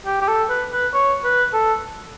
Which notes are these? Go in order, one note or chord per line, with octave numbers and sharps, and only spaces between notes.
G4
G4
A4
B4
B4
C#5
B4
A4